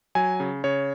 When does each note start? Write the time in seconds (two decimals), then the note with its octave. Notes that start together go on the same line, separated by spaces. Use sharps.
0.15 F#3 G#5
0.40 C#3
0.64 C#3 C#5